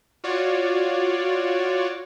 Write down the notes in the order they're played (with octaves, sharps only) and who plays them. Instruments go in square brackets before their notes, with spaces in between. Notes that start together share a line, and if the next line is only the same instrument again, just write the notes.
[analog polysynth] F4 F#4 C#5 D5